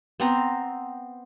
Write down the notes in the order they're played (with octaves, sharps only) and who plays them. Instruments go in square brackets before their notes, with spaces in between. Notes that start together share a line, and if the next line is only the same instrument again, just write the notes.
[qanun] B3 C4 A#5